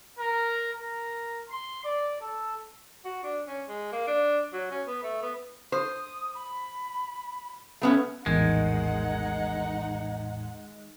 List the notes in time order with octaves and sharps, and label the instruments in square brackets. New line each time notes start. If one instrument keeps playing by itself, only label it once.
[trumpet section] A#4
A#4
C6
D5
A4
[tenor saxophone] F#4
D4
C#4
G#3
A#3
D4
F#3
C#4
B3
A3
B3
[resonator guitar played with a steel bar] C5 [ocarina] D#6
[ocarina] B5
[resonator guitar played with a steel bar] A3 B3 C#4 [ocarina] B5
[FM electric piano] A#1 E2 A2 [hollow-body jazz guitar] D#3 [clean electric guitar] G#3 [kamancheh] D#4 F#5